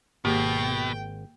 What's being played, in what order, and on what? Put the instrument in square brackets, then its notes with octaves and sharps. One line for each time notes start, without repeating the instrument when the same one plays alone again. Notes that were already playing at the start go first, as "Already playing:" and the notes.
[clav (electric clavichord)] G#1 [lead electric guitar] B2 [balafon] A#3 G4 [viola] G5